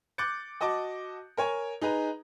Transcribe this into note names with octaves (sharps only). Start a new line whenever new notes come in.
D6 F#6 G6 A6 C#7
F#4 D#5 A5 D6
A#4 C#5 G#5
D#4 G#4 B4 A#5